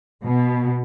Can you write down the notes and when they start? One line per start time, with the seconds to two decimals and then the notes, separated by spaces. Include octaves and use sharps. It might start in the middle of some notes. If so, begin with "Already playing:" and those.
0.25 B2